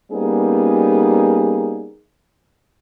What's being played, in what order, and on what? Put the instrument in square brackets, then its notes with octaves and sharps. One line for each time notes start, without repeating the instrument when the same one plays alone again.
[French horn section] G3 A#3 B3 C#4 D#4 G#4